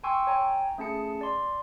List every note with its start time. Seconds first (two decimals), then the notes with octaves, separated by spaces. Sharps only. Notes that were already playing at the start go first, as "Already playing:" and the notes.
0.03 G5 G#5 C6 C#6 E6
0.27 C#5 G5 G#5 A#5
0.78 A3 C#4 G#4 A5 C#7
1.21 D5 C6